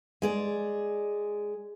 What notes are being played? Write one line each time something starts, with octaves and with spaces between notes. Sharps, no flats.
G#3 G#4 D5